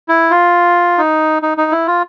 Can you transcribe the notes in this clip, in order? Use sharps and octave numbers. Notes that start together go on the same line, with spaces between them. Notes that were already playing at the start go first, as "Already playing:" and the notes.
E4
F4
D#4
D#4
D#4
E4
F4